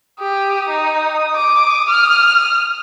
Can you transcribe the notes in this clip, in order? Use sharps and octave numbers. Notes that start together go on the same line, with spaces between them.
G4 D#6
D#4
D6
F6